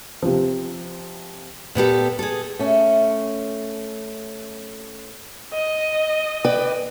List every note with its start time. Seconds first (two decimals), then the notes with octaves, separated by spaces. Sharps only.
0.22 C3 F3
1.75 A#2 B3 G4 A4
2.19 G#4 A4
2.59 A3 C#4
5.54 D#5
6.45 B4 D5 G5